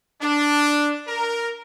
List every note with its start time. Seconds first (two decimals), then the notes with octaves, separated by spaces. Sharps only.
0.21 D4
1.08 A#4